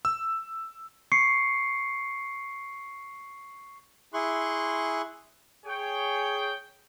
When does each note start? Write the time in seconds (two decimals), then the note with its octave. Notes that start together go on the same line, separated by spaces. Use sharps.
0.05 E6
1.12 C#6 C7 C#7
4.14 E4 G#4 C6 C#6 F#6
5.66 G#4 C#5 G5